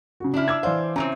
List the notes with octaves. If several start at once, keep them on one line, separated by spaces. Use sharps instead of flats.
C#3 F#4
C#3 D4 E4 F6
D6 E6 G#6
E3 C5 D5 F5
C#3 E3 C4 C#4 G#5 A#5